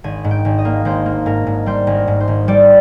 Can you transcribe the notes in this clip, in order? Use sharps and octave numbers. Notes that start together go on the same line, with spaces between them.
G#1 G#5
G#2
G5
G#1
D#5
A#3
G#1 C5
A#3
G#2 A#4
G#2
G3 C5
G#1
A#4
G#2
C5
G#1
G3 D5